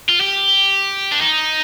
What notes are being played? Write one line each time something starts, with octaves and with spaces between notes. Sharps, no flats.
F4
G4
D4
D#4